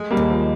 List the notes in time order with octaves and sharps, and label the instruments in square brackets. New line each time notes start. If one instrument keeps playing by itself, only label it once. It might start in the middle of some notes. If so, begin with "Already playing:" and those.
Already playing: [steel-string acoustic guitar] G#3
[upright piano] G3 A#3
[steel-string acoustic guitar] D#2
[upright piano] F3